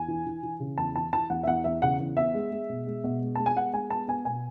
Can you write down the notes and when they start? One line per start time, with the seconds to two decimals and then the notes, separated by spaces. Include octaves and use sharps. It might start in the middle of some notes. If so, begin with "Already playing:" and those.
Already playing: E2 G#5
0.08 E3
0.26 E3
0.43 E3
0.60 C#3
0.78 E2 A5
0.95 E3 A5
1.13 E3 A5
1.30 E2 F#5
1.43 E5
1.47 E2 F#5
1.64 E2 E5
1.82 C#3 F#5
2.00 E2
2.17 B3 E5
2.34 G#3
2.51 G#3
2.70 B2
2.86 G#3
3.04 B2
3.22 G#3
3.35 G#3 A5
3.46 G#5
3.56 B3 F#5
3.73 G#3 G#5
3.90 B3 A5
4.08 B3 G#5
4.25 B2 G#5